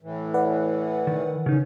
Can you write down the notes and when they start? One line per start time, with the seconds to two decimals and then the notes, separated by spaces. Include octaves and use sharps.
0.02 A2 E3
0.34 B4 D5 F#5
1.07 D#3
1.46 C#3 C#4 D#4